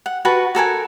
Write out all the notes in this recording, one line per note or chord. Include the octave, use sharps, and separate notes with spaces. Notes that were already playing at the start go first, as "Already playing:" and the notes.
F#5
F#4 B4 F#5 A5
F#4 A4 A#4 G#5